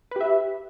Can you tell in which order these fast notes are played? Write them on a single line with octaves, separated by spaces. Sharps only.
B4 G4 E5